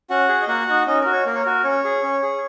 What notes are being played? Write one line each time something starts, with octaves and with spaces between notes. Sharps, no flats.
C#4 F#4 F#5
G#4
D#5
A#3 F#4 F#5
D#4 F#4
C#4 D#4 D#5
A#4
F#4
C#5
A#3 A#4
C#5
F#4 A#4
C#4 C#5
G#4
C#4
G#4